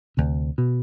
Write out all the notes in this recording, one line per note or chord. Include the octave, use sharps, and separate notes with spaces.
D2 C3
B2